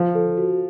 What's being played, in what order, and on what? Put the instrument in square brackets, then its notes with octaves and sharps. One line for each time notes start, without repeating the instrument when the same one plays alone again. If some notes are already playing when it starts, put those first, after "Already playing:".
Already playing: [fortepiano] F3
[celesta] A4
F#4